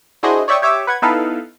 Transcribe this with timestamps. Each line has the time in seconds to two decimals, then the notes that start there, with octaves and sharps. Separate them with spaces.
0.23 D4 E4 F#4 G#4 C5 D#5
0.48 C#5 D5 E5 G5 C#6 D#6
0.62 G4 C#5 E5 D6 E6
0.87 B4 F#5 G#6
1.02 B3 D#4 E4 A4 B4 F5